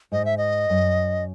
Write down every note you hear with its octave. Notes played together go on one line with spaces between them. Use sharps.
G#2 D#5
E5
D#5
F#2